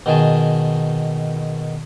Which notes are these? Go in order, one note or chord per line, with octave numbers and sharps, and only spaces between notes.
B2 D#3 G#4 A5